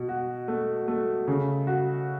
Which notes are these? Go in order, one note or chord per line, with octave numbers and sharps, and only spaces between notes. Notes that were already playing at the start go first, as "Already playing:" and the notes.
Already playing: B2
F#4
A3
A3
C#3
F#4